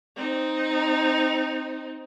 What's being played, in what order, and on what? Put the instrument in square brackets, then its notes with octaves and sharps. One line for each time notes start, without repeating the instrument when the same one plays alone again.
[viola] C4 D#4